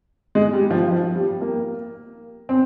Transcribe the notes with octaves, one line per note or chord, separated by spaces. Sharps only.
G#3
G3
F3
F3
G3
A#3
C4